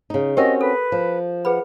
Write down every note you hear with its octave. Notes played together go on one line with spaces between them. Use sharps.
C#3 D#4
C4 C#4 F#4 G4 A#4 D#5
A4 B4
F3
G#4 B4 F#5 B5